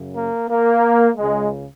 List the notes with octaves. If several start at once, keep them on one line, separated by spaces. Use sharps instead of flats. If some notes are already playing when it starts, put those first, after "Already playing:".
Already playing: F#2 C#3
A#3
A#3
C#2 C#3 G#3